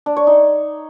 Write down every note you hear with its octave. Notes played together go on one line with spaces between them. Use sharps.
D4
C#5
D#4